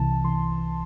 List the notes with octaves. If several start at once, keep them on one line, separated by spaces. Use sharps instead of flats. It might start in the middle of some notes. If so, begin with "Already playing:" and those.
Already playing: C2 C3 E3 A5
C3 E3 C6